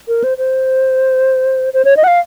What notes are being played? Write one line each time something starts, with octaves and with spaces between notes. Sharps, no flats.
A#4
C5
C5
C5
C#5
D#5
F#5
F5